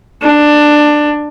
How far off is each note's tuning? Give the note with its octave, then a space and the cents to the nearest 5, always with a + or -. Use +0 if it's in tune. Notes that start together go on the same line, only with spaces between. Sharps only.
D4 +15